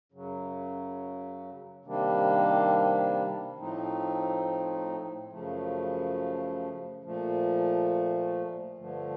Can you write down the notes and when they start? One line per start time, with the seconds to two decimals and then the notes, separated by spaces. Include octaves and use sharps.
0.12 F#2 C#3 F#3
1.85 C3 D#3 G3 A#3 D4
3.58 A2 F3 A3 C4 D#4
5.31 F#2 C#3 F3 A3
7.04 A#2 F3 A3
8.77 G2 D3 F3 A3